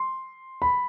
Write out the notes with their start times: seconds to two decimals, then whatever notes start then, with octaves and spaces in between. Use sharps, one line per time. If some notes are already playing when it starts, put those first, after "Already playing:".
Already playing: C6
0.62 B5